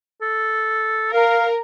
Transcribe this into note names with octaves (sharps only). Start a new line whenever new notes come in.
A4
A#4 F5